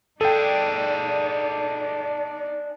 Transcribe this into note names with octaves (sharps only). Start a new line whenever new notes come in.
D4 D#4 G#4 A4 D5 G5